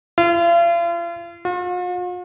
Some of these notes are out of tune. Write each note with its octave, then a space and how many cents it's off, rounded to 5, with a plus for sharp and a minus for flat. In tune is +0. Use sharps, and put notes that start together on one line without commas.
F4 -40
F4 +45